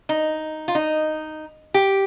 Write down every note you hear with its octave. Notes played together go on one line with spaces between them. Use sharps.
D#4
F4
D#4
G4